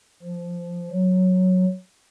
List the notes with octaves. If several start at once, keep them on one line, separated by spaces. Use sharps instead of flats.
F3
F#3